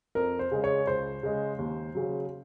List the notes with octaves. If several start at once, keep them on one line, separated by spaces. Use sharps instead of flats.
F2 A#4
C5
C#3 G#3
C#5
C#2 C5
C#3 G#3
D#2
C#3 F#3